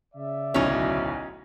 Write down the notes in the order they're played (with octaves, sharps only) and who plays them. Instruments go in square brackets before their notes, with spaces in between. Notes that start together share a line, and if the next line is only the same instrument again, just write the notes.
[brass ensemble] C#3 D5 E5
[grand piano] D1 B1 C#5 [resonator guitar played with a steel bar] C#4 D#4